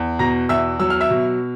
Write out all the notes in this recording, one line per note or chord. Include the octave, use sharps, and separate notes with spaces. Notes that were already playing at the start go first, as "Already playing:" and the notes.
Already playing: E2
B2 A#5 A#6
E2 E5 E6
F#3 E6
F6
E5 E6
B2